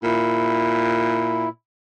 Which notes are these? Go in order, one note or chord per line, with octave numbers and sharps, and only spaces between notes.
A#2 E4